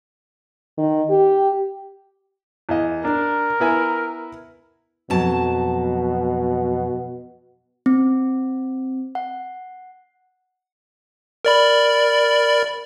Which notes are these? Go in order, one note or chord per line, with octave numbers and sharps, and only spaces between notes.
D#3
G4
E2 D#5
D4 A#4
B3 E4 G#5
F2 B2 F#3 A5
C4
F#5
A#4 D5 B5